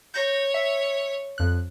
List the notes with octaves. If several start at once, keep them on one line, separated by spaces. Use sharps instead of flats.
C#5 G6 A#6
E5
F2 F#6